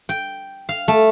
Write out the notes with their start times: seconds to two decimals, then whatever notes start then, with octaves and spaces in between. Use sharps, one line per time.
0.09 G5
0.69 F5
0.88 A3